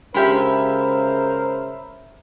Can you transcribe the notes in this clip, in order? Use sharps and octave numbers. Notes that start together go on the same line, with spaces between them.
C#3 G#3 F4 G4 A#4 C5 E5 B5